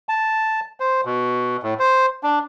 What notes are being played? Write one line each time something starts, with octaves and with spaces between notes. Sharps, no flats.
A5
C5
B2
A2
C5
D4